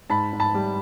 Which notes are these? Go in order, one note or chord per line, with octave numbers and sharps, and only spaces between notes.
G#2 A5 B5
G#2
A5 B5
G3